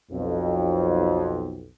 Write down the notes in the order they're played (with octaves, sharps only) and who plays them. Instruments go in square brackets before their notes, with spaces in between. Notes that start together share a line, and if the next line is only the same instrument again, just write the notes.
[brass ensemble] B1 F2